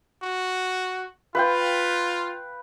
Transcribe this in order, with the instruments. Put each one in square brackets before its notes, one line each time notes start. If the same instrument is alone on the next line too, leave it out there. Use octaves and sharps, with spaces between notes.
[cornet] F#4
[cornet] F4 [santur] B4 F5 G5